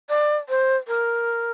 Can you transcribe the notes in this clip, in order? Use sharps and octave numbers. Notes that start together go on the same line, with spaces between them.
D5
C5
A#4